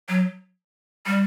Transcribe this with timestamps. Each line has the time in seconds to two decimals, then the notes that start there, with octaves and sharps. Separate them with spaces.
0.09 F#3
1.07 G3